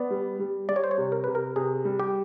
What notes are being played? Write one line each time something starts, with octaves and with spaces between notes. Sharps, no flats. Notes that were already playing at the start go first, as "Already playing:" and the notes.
Already playing: B3 D5
G3
G3
G3 D5
C#5
C5
C#5
C3
A#4
C3 B4
A#4
C3 G#4
G3
G4